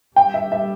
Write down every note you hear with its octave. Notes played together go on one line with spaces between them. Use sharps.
G3 G5
E5
E5